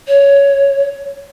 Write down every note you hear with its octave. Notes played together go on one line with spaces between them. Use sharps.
C#5